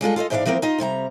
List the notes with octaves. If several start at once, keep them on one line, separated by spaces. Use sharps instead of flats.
G3 G#3 F4 A4
F4 A4 C5 D#5
G#2 E3 D4 G#4 D5 F5
E3 F3 A#3 C4 A#4
D#4 F4 D#5
F2 C3 G3 A#5